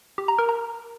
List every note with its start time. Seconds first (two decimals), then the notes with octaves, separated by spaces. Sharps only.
0.18 G4
0.28 A#5
0.39 A#4
0.49 A#5